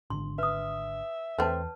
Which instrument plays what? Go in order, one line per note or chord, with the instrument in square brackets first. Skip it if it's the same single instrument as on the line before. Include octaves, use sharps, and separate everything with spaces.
[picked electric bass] G#1 D3 [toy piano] C6
[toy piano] B4 D#6 [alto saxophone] E5
[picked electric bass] E2 [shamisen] A3 C4 [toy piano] B4 C#5 A5